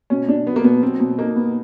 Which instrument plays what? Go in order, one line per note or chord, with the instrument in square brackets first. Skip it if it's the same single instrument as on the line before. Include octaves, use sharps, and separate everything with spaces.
[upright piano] B2 [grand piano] C#4
[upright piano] B2 [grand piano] D4
[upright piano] F#3 [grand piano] B3
[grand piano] A#3
[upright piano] B2 [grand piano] B3
[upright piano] F#3 [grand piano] C4
[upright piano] B2
[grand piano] A#3 [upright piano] D#4
[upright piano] B3